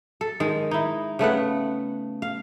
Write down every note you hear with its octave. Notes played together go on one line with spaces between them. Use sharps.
A4
D#3 G#3
D#4 E4
C#3 A3 B3 F#5
F5